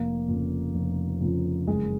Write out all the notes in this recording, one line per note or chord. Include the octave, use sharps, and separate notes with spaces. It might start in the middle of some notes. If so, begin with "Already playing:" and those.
Already playing: F1 A#3
F2 C#3 F3
F1
F2 C#3 F3
F#1 G#3